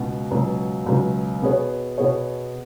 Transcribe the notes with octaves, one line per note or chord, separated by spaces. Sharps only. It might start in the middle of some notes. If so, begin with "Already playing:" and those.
Already playing: C#2 B2 B3 F#4
C#2 B2 F#3
C#2 B2 F#3
B2 B3 G#4 C#5
B2 B3 G#4 C#5